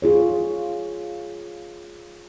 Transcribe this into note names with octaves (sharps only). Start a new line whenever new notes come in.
F4 G#4 C#5